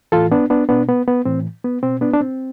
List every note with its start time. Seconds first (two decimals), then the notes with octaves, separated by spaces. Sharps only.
0.12 A2 E3 F4 A4
0.31 B3 D4
0.50 B3 D4
0.69 B2 B3 D4
0.88 B3
1.08 B3
1.25 A2 E3 C4
1.65 B3
1.83 B2 C4
2.01 B3 D4
2.14 D4
2.21 C4